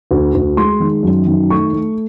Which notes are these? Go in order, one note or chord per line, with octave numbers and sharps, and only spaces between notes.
D2
D2
G#3 C6
D#3
F#2
D#3
A3 C#6
A3